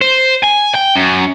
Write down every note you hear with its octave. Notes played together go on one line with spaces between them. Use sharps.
C5
G#5
G5
F#2